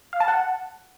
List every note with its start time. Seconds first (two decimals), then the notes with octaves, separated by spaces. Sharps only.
0.13 F5
0.20 A5
0.28 F#5